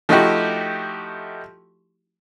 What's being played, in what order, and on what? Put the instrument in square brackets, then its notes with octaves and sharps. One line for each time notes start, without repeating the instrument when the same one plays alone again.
[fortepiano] F3 A3 D#4 E4 F#4 G4